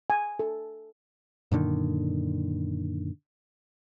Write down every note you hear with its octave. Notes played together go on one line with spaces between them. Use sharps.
G#5
A4
F#2 A#2 D3 D#3